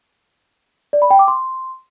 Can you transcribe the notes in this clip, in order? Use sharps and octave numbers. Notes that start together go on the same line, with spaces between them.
D5
B5
G5
D6
C6